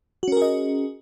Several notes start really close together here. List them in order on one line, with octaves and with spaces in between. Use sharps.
F#4 C#4 A#4 G#4 D#5